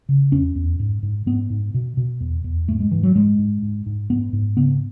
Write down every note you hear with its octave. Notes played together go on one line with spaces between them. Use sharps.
C#3
E2 C#4
E2
G#2
G#2
G#2 B3
G#2
B2
B2
E2
E2
G#2 A3
G#3
G#2 E3
F#3
G#2 G#3
G#2
G#2
G#2
G#2 B3
G#2
C#3 B3